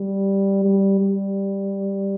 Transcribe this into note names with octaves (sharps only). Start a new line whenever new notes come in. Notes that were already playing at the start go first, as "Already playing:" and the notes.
Already playing: G3
G3
G3